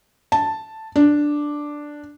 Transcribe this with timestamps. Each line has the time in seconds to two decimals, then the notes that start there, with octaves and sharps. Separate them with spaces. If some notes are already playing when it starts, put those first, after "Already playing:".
0.32 A5
0.96 D4